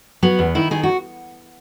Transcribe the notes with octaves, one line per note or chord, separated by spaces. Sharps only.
F#3 B3
E2
D#3 E4
D#3 G#4
F#4